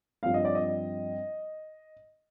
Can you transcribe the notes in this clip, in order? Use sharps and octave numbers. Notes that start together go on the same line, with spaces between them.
G2 F3 C4 F5
D#5
D5
D#5